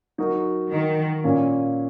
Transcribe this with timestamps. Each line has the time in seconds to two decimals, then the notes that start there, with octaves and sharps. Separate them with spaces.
0.18 F#3 D#4 F#4 A#4
0.71 D#3
1.24 A#2 A#3 C#4